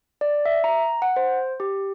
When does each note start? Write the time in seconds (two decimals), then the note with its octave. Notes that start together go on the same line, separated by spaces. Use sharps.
0.21 D5
0.45 E5
0.64 A#5
1.02 F#5
1.16 C5
1.60 G4